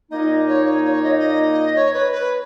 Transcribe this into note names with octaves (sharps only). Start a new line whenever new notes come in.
A#2 A#3 D#4 D#5
C#5
C#5
C#5
D#5
D#5
C#5
B4
B4